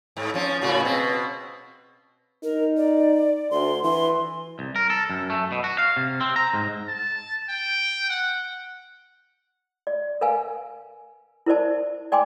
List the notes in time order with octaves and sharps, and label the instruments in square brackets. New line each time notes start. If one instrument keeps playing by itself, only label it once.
[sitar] G#2
F3 C#4
A2 C#3 F#4
B2 C4
[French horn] D#4 [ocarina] A#4
[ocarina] D5
[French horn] D2 [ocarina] C6
[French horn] E3 [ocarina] C6
[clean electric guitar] C2
A#4
A4
F#2
A3
B2
F#4
F5
C3
C4
A#5
G#2
[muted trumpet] A5
G5
F#5
[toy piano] D5
A#4 B4 F5 G#5
E4 A#4 C5 D5 A5
D5 G5 G#5 C6 D6